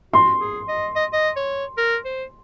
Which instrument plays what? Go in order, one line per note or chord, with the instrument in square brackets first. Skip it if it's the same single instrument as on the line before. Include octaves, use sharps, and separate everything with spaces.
[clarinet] F#4 [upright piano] C6
[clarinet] G#4
D#5
D#5
D#5
C#5
A#4
C5